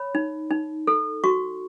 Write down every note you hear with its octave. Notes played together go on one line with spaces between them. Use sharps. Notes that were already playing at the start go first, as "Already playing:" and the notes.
Already playing: C#5 B5
D#4
D#4
A4
F#4 C#6